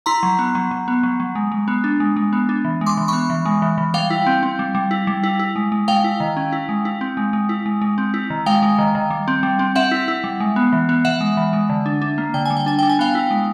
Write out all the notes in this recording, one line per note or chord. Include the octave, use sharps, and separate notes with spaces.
E4 A#5 C6
F#3
B3
F#3
F#3
B3
F#3
F#3
G#3
G#3
B3
D4
G#3
G#3
B3
D4
E3
G#3
C6 D6
E3
B3 B5 C#6
E3
G#3
E3
E3
G3 F5 G5
E4
C4
C4
G3
G3
E4
G3
E4
E4
G#3
G#3
G#3 F5 G5
E4
D#3
C#4
E4
G#3
E4
C4
G#3
G#3
E4
G#3
G#3
C4
E4
D#3
G#3 F5 G5
G#3
D#3
D#3
G3
C4
G3
C4
C4 E5 F#5
E4
E4
G3
G#3
B3
E3
B3
E3 E5 F#5
G#3
E3
G#3
D3
D4
D4
A#3
D3 G5
G3 G#5
G5
D4 G#5
D4 G5
G#5
B3 F5 G5
E4
G#3